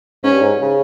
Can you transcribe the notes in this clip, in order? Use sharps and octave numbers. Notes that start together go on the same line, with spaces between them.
G#2 C#4
G2
G#2
C#3